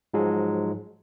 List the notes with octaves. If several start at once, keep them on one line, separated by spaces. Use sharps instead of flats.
G#2 F3 F#3 G#3